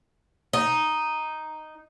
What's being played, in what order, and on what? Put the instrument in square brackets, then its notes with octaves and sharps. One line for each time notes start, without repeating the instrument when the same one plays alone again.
[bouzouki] D#4